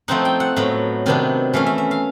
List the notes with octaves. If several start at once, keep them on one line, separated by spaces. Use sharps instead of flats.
F3 A3 C4 D#4 F#5
G5
F#5
A2 F#3 B3
C3 D#3 F#3 B3 D4
E3 A3 C#4 F5
E5
E5
F5